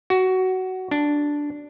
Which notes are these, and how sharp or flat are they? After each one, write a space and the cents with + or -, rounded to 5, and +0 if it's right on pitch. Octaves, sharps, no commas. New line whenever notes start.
F#4 +15
D4 -5